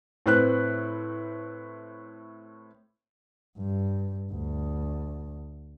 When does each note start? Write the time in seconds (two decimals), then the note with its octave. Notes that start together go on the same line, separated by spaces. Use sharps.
0.26 A2 C4 B4 F#6
3.58 G2
4.32 D2